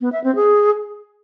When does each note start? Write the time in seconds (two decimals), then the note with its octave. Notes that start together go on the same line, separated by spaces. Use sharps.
0.01 B3
0.12 E5
0.24 C4
0.35 G#4